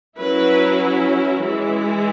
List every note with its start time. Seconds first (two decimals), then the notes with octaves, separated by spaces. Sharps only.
0.18 F#3 C#4 E4 B4
1.43 E3 G#3 E4